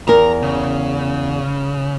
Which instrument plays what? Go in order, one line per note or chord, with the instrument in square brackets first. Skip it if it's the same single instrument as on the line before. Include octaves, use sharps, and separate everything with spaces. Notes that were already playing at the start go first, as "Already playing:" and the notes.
[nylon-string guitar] E2 A#4 [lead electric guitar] A#5
[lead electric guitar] C#3